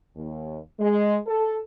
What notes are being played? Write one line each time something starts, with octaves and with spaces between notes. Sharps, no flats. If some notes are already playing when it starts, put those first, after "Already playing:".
D#2
G#3
A4